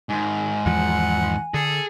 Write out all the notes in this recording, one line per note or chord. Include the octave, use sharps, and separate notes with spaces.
G#2 D#3 G#5
E2 E3 F3 F#5
D3 G#4 A4